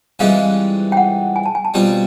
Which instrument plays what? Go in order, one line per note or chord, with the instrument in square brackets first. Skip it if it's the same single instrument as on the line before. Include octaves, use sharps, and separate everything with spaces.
[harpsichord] G2 E3 G#3 C4 F4 [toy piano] F5
[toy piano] G5
F#5
G#5
A5
G#5
A5
[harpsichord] B2 G3 C4 F4